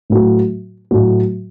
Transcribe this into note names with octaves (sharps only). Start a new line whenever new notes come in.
A2 F#3 A3 F#4
A2 F#3 A3 F#4